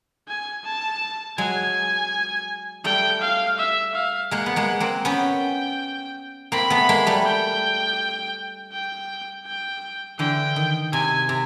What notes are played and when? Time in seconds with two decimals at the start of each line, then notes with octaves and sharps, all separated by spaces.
0.28 G#5
0.65 A5
1.38 F#3 G#3 G#5
2.84 G3 A3 G5
3.22 F5
3.58 E5
3.95 F5
4.31 G#3 A#3 F#5
4.46 B3
4.56 G#3 A#3
4.80 A#3 C4
5.05 B3 C#4 G5
6.52 A#3 C4 B5
6.70 A3 B3
6.89 G#3 A#3
7.07 G3 A3
7.26 G5
8.73 G5
9.46 G5
10.19 D3 E3 G5
10.56 D#3
10.93 C3 G#5
11.29 C3